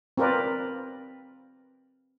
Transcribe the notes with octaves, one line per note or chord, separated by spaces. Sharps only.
C4 F4 A#4 B4 D5